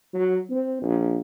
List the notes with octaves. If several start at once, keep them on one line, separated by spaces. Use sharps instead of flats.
F#3
C4
A#1